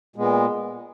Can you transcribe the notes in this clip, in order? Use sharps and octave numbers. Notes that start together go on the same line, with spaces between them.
A#2 G#3 B3